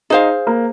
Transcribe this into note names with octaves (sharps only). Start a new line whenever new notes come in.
D#4 G#4 C5 F5
A#3